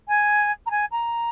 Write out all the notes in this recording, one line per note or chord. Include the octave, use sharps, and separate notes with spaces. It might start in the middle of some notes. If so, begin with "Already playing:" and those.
G#5
A#5
G#5
A#5